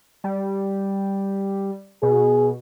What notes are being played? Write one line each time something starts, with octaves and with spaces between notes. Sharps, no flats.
G3
B2 G#4